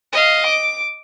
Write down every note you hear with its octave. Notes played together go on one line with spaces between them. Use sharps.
D#5 F5
D6